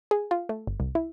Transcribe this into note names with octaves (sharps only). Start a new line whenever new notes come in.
G#4
F4
A3
G1
C2
E4